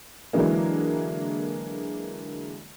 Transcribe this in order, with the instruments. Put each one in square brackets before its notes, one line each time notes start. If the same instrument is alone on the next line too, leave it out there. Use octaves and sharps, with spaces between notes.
[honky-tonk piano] D3 E3 F#3 G#3 A#3